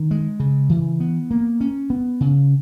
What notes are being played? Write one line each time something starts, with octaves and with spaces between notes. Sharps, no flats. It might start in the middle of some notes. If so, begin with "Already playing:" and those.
Already playing: D#3
G#3
C#3
E3
B3
A#3
C#4
B3
C#3